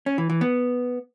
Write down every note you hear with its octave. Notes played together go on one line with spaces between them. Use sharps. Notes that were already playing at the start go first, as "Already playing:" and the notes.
C#4
E3
E3
B3